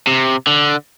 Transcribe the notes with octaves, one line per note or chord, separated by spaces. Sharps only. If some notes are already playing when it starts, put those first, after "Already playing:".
C3
D3